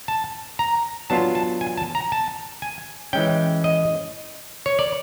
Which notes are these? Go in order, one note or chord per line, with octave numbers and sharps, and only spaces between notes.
A5
A#5
F#3 B3 D4 F4 A5
A5
G#5
A5
A#5
A5
G#5
E3 G#3 C#4 G5
D#5
C#5
D5